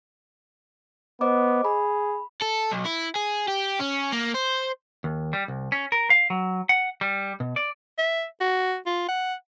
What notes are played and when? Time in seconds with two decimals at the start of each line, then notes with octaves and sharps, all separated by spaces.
1.21 B3 C5 D#5 D6
1.65 G#4 B5
2.41 A4
2.71 B1
2.85 E4
3.15 G#4
3.48 G4
3.80 C#4
4.12 A#3
4.34 C5
5.04 D#2
5.33 G3
5.48 C2
5.72 C#4
5.92 A#4
6.10 F5
6.30 F#3
6.69 F#5
7.01 G3
7.40 B2
7.56 D5
7.98 E5
8.41 F#4
8.86 F4
9.08 F#5